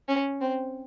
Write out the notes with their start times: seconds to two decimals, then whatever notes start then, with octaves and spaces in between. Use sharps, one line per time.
0.08 C#4
0.41 C4